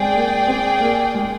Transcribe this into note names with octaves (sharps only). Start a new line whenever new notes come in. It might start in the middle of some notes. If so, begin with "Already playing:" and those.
Already playing: G#3 C4 G#4 D5 G5
A#3
C4
A#3
G#3